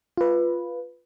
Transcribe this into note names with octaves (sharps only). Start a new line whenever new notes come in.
F4 B4